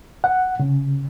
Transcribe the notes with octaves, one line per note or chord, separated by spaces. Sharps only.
F#5
C#3